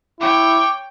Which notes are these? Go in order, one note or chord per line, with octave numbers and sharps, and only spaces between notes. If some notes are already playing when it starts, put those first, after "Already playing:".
E4 C#5 G5 D6